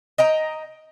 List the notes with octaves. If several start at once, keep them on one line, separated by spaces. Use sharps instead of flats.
D#5 G5 A#5